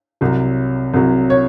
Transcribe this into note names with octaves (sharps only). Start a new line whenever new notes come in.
C2 C3 F#3
C2 C3 F#3
C#5